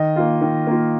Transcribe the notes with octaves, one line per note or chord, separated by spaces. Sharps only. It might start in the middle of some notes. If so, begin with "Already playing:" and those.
Already playing: D#3 D#5
A#3 F4
D#3
A#3 F4